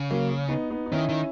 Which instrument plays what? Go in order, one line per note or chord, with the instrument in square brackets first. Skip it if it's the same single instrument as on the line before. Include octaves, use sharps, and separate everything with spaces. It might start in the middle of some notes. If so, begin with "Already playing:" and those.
Already playing: [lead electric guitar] C#3
[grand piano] F#3 A#3
B3 D#4
B3 D#4
D#4
[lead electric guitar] D#3 [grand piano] C#4 E4
[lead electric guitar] D#3